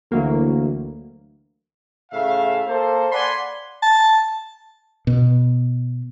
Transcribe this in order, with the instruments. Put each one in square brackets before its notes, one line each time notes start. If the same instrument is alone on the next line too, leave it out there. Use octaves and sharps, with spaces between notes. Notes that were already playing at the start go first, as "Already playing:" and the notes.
[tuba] D2 [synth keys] E3 F#3 A#3
[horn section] A2 C#3 E5 F5
A#3 A4 C5
D5 F#5 G#5 B5 C6
[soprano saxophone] A5
[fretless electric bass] B2